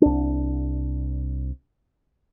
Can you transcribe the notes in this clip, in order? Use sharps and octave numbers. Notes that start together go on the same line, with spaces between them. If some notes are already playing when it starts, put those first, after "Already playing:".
C2 D4